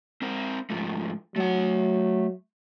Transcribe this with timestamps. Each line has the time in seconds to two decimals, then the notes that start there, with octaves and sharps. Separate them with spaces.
0.22 C4 A#4 C5
0.70 G#2 F3 A3
1.36 F#3 A3 F#5